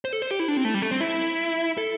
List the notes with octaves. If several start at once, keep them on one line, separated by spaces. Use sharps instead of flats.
C5
A4
C5
G4
E4
D4
C4
A3
G3
A3
C4
E4
A4